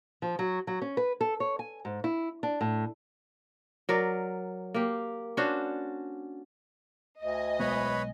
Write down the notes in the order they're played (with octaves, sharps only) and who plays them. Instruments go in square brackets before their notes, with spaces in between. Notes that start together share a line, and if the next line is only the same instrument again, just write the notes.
[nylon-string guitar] F3
F#3
F#3
C#4
B4
A4
C#5
G#5
G#2
E4
D4
A2
[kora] F#3 A#4 D5
A#3 G4
C#4 D4 F#4 C5
[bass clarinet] D2 [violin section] D#5 G#5
[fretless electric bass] B1 G#3 B3 [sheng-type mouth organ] B4 C#5 B5